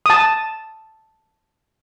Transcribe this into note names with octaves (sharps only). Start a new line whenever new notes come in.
A5 D#6